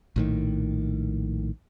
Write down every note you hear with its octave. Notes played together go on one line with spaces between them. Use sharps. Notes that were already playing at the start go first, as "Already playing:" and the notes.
A#1 A2 D#3